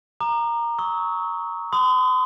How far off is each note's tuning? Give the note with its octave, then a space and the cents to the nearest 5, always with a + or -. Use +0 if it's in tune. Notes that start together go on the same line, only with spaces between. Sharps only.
A#5 +0 D6 +45
C#6 +0 E6 -35
C6 -45 D#6 +0